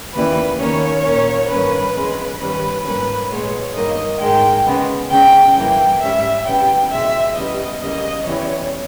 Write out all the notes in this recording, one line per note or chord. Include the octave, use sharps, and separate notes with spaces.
D#2 C#3 E3 G3 B4
D#2 D#3 A#3 C#4 C#5
A#2 A#3 C#4
G2 D#3 A#3 C#4 B4
E2 C#3 G#3
G2 D#3 G3 C#4 B4
G#2 G3 A#3 C#4 B4
A#2 G#3 B3 C#5
G2 D#3 A#3 D#5
G#2 D#3 G#3 G5
C#3 G#3 B3
C#3 G#3 C#4 G5
G2 E3 A#3 G5
G#2 G3 C#4 E5
E2 C#3 G3 B3 G5
E2 B2 G#3 E5
E2 C#3 G3 B3 D#5
E2 C#3 G3 A#3 D#5
E2 C#3 E3 G3 C#5